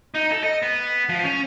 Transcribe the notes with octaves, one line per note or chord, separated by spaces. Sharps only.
D#4
A4
D#5
B3
F3
C#4